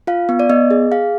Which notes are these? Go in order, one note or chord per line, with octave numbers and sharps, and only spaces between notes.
F4 F5
B3
D5
B3 D#5
G#4
G#4 F5